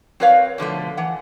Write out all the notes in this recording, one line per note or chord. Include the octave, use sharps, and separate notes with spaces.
C4 A#4 B4 C#5 D5 F5
B2 D3 F3 A3
E3 F#5